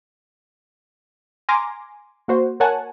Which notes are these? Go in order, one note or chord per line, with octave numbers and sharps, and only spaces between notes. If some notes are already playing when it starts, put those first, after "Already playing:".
G#5 A#5 C6 D6 F6 A#6
A#3 F#4 C5
A#4 C#5 F#5 G#5 A5